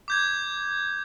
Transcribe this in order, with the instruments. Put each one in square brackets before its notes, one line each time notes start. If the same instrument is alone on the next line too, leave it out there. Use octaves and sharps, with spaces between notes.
[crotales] D6 G6 G#6